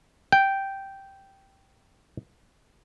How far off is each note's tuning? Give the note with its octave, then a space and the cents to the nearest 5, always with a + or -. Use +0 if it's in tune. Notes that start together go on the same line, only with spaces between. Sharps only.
G5 -5